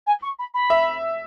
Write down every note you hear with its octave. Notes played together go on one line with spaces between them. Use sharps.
G#5
C#6
B5
B5
E5